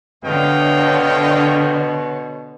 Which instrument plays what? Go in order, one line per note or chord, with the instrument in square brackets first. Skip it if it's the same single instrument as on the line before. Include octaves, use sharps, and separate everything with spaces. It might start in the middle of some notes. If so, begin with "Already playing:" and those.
[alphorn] B2 [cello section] D3 C#5 [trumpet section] D#5 F5 G5